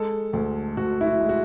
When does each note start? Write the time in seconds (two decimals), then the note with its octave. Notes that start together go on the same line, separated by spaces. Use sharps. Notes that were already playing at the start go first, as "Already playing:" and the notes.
Already playing: G#3 A4
0.33 D2
0.77 D2 F#4
1.01 E4
1.06 F#4
1.21 G#3
1.29 F#4